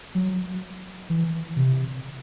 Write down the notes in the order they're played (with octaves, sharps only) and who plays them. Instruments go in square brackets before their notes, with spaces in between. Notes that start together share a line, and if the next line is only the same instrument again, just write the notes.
[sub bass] F#3
E3
C3